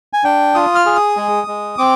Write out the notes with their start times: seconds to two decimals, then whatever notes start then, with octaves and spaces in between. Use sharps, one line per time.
0.13 G#5
0.24 D4 G5
0.55 F4 D#6
0.75 F6
0.86 G#4
0.96 D#6
1.17 G#3
1.47 G#3
1.78 C4 D6